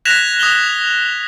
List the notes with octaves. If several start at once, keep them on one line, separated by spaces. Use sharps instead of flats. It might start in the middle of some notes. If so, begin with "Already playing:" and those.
F#6 G#6 A#6 B6 E7 F7
D#6 G#6 F7 G7